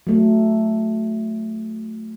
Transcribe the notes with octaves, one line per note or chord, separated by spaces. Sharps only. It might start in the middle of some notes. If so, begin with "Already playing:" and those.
F#3 A3